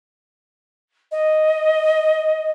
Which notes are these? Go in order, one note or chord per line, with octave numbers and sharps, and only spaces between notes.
D#5